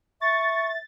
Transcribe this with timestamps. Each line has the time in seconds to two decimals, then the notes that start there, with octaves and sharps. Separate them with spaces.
0.21 E5 C#6 A6